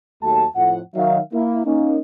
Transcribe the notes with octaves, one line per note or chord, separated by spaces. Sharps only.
D#2 F#3 A3 A5
F2 A2 F3 F#5
D#3 F#3 E5 F5
A#3 E4
A#3 C#4 D#4